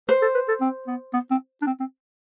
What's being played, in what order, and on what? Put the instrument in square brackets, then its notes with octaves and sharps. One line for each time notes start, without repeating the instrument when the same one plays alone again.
[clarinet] B4 [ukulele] C5
[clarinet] A4
B4
A4
C4
B3
B3
C4
D4
C4
C4